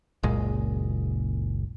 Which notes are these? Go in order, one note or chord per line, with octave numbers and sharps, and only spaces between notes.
F#1 C#2 A#2 G#3